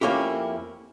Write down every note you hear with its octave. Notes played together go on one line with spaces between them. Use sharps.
F2 A#3 C4 C#4 E4 G4